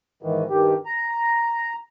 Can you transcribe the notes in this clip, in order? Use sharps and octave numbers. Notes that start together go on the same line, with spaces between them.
G#2 D#3 E3
G2 D#3 G4
A#5